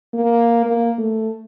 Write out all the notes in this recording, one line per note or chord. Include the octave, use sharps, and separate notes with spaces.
A#3
A#3
A3